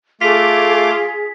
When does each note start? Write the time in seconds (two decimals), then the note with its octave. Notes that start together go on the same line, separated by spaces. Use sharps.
0.21 A3 F4 G#4 D6 B6